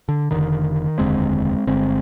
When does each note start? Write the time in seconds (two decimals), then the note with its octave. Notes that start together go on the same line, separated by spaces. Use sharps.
0.09 D3
0.31 F1 D#2 D3 D#3
0.98 F1 D#2 D3 G#3 C4
1.67 G1 G2 D3 G#3 C4